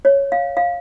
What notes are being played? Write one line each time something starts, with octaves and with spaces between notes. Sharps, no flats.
C#5
F5
F5